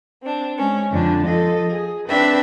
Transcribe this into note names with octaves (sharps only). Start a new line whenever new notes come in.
C4 D4
G#3 C#4
F2 D3 D4
F3 A4 D#5
G#4
C4 D4 B4 E5 G5